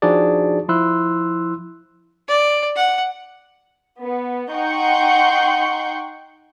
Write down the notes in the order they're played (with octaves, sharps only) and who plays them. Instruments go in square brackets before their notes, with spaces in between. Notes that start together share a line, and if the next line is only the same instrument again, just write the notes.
[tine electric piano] F3 D4 D#4 F#4 G#4 D5
F3 E4 C6 E6 F#6
[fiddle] D5
F#5
[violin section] B3
D#4 F#5 G5 C6 C#6 G6